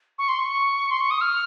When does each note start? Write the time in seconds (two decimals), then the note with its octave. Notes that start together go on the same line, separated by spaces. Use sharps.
0.18 C#6
0.28 C6
0.39 C#6
0.91 C6
1.00 C#6
1.11 D#6
1.21 F6